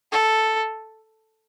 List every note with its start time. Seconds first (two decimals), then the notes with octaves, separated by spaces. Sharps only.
0.12 A4